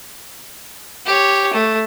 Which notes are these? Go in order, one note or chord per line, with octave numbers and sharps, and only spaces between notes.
G4 C#5
A3